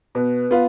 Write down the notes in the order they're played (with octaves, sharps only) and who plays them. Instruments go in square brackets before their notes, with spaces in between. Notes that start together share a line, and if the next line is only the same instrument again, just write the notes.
[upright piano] B2 [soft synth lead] B4
[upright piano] B3 F4